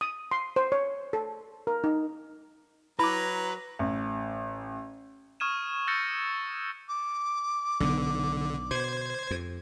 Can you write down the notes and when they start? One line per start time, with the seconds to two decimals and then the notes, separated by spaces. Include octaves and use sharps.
0.01 D#6
0.31 C6
0.56 C5
0.72 C#5
1.13 A4
1.67 A#4
1.84 D#4
2.99 F#3 E4 B4 A#5 D6
3.79 A1
5.40 C#6 D#6 F6 G#6 D#7 E7
5.87 E6 F6 G6 A6 A#6 C#7
6.88 D6
7.80 B1 D3 B3
8.71 B2 C5 G#6
9.31 F2